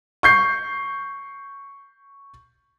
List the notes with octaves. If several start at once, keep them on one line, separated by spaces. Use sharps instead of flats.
C#6 G6 C7